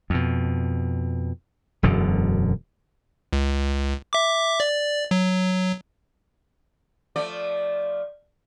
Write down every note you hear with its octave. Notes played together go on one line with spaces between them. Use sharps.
F2 B2
E1 F#2 B2 D3
C#2
E5 D6
D5
F#3
F3 A3 D5